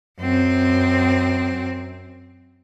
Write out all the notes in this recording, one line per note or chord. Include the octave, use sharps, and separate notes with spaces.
F#2 C4